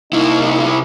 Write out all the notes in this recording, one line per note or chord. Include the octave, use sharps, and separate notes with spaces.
C2 A#3 D#4 E4